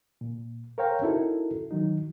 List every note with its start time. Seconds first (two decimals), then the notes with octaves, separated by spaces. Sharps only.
0.21 A#2
0.78 A#4 C5 C#5 F5 G5 A#5
1.02 C#4 D#4 E4 F#4 A4 A#4
1.71 D#3 F#3 D#4